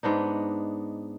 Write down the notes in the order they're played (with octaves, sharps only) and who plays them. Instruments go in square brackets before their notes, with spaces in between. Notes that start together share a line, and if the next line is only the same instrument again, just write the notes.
[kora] G#2 B3 D4 D#4